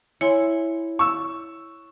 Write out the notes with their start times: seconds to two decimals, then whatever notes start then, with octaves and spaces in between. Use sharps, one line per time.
0.21 E4 C#5 G#5 C6
0.99 C#6 E6